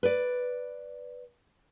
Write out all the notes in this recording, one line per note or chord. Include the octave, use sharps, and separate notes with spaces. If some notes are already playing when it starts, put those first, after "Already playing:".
B4 D5